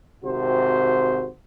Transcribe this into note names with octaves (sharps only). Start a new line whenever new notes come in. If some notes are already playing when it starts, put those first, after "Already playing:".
G#1 C3 F#4 C5